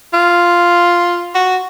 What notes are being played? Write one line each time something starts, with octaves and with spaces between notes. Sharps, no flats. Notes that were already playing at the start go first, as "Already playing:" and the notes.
F4
F#4